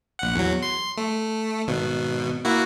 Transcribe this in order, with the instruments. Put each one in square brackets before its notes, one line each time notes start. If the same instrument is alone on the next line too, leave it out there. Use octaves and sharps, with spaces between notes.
[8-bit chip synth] A#1 F#5
E2 F#3
C6
A3
G#1 B2
A#3 E4 F#4